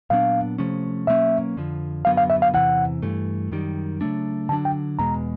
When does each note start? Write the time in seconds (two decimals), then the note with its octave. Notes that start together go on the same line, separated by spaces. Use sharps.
0.10 A#2 F#3 B3 D4 F5
0.58 C3 F3 A3 C#4
1.07 B2 F#3 A#3 C#4 E5
1.57 F2 D3 F3
2.05 F#2 D3 F#3 B3 F5
2.17 F5
2.30 E5
2.42 F5
2.54 E2 C3 E3 F#5
3.02 G2 E3 A3
3.51 F#2 D#3 G3
4.01 C#3 F#3 A3 D4
4.49 D3 F#3 A#3 D4 A5
4.65 G5
4.99 E2 B2 G#3 A#5